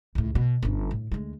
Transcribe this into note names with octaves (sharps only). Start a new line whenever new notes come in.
C#2 A2
B2
G1 C#4
A2
D2 G#3